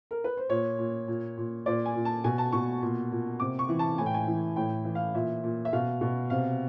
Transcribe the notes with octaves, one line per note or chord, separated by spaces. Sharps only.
A#4
B4
C5
A#2 C#5
A#2
A#2
A#2
A#2 D5
G#5
A#2
A5
B2 G#5
A5
B2 C#6
A#2
A#2
C3 D6
C#6
E3
A5
A2 G#5
G5
G#5
E3
A2 G5
E3
F5
A#2 E5
A#2
E5
B2 F5
B2
C3 F5